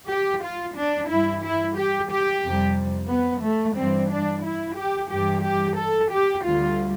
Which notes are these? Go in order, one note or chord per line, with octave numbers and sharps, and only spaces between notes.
G4
F4
D4
G2 E3 G3 E4
E4
G4
G4
F2 C3 G3
B3
A3
G2 E3 G3 C4
D4
E4
G4
G2 E3 G3 G4
G4
A4
G4
D2 D3 G3 F4